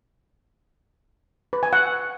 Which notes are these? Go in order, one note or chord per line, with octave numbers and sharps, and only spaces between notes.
B4
G#5
F#5